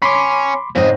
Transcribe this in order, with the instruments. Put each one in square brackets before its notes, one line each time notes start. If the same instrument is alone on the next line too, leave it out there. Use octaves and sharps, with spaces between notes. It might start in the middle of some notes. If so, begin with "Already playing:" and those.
[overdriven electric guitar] C#4 [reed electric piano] B5 C6 D6
[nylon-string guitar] G#2 C4 [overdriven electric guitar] C#3 D#5